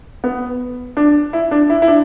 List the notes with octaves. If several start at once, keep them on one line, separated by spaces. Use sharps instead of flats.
B3
D4
E4
D4
E4
E4
D4